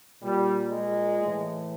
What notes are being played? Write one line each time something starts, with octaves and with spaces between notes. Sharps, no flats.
A#2 G3
G#3
A2 E3